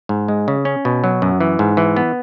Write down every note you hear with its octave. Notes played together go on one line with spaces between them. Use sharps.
G#2
G#3
C#3
C#4
B2
F#3
F#2
E3
G#2
E3
B3